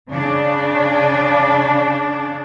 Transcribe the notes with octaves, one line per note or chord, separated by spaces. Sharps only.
C#3 D4